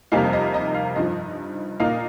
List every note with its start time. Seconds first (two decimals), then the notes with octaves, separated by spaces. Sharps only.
0.12 F2 C3 G3 A#3 D#4 F5
0.33 D#5
0.54 D#5
0.74 F5
0.96 G2 F3 D#4 D#5
1.80 A#2 A#3 D#4 F5